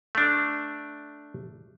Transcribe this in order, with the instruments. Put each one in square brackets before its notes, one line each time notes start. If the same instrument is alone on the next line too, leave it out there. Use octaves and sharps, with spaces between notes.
[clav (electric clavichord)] A3 D4